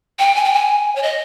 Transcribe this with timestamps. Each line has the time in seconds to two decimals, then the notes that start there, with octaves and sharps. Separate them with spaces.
0.19 G5
0.35 G#5
0.44 G5
0.54 G#5
0.96 C#5
1.03 D#5